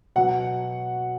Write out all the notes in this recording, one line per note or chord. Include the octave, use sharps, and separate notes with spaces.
B2 F#3 F#5